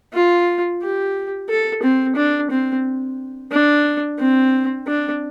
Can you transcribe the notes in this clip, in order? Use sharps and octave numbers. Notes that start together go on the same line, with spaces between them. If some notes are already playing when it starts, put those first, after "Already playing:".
F4
G4
A4
C4
D4
C4
D4
C4
D4